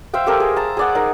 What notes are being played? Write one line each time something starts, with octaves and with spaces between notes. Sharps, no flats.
C5 E5 F5 G5
G4 A4 A#4
G#4
A5 A#5
G#4 D5 F#5
D#4 A#4